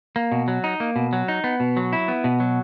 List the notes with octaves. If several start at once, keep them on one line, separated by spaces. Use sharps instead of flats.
A#3
B2
F#3
D#4
A#3
B2
F#3
D#4
B3
B2
F#3
E4
B3
B2
F#3